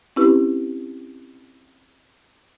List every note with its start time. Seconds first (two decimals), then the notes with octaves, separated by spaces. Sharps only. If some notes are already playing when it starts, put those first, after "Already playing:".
0.16 C4 C#4 E4 G4 B4